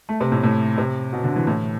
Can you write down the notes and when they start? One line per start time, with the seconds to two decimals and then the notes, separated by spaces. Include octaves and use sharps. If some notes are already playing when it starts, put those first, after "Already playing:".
0.09 A3
0.21 C3
0.32 A2
0.43 A2
0.78 C3
1.13 B2
1.24 D3
1.36 E3
1.47 A2